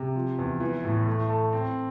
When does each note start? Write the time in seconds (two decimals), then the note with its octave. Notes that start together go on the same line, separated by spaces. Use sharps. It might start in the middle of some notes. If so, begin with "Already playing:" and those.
Already playing: C3
0.15 F3
0.39 E2
0.60 E3
0.84 A2
1.06 A3
1.30 A4
1.53 C4